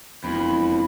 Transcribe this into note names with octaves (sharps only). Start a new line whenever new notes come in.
E1 F2 E4 B5